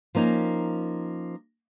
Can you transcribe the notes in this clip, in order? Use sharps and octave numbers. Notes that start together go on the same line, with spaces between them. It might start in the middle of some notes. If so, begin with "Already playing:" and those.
F3 A#3 C#4 D#4